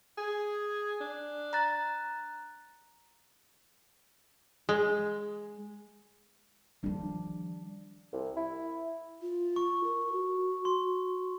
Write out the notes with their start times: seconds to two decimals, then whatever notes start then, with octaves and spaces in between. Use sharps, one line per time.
0.18 G#4
1.01 D4
1.53 A#5 F#6 A6
4.69 G#3
6.83 D#3 F3 G3 D4
8.12 C2
8.36 E4
9.22 F4
9.56 C#6
9.84 A#4
10.12 F#4
10.65 C6